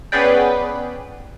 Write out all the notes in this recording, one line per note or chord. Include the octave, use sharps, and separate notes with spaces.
B3 C#4 G#4 B4 D5 G5